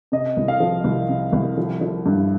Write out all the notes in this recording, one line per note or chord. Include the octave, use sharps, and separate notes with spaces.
C3 D#5
C2
F5
F3
C2
C3
C2
F3
F3
G2